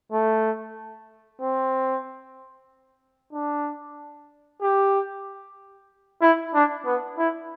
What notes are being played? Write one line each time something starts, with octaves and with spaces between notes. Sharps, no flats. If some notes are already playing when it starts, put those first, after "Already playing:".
A3
C4
D4
G4
E4
D4
B3
E4